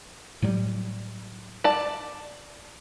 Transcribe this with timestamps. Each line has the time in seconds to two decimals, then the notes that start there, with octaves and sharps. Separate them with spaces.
0.42 A2 F#3 G3
1.64 D5 A5